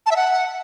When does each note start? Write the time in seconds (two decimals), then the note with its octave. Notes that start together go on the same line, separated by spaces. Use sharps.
0.06 A5
0.11 E5
0.16 F#5